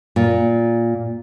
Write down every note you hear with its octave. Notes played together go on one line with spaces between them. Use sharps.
A#2